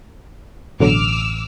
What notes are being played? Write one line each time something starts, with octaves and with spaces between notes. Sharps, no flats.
A1 B2 D3 F#3 D6 E6 F6